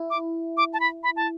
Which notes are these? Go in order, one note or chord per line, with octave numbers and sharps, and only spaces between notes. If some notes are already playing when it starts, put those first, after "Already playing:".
Already playing: E4
D6
D6
A5
B5
B5
A5